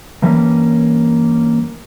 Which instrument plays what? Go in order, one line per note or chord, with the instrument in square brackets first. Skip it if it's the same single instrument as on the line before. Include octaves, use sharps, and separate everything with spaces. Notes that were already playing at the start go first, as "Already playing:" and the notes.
[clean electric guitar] G2 E3 G3 A#3 C#4